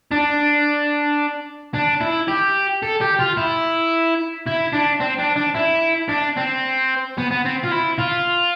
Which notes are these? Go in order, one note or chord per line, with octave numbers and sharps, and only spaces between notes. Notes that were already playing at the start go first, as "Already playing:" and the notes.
D4
D4
E4
G4
A4
G4
F4
E4
E4
D4
C4
D4
D4
E4
D4
C4
B3
B3
C4
F4
E4
F4